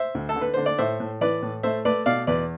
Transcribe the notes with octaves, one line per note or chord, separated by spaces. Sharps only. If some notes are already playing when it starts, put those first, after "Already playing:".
Already playing: C5 E5
D2
A4
D3
B4
D3 C5
D5
A2 C5 E5
A2
E3 B4 D5
A2
A3 C5 E5
A3 B4 D5
B2 D5 F5
E2 B4 D5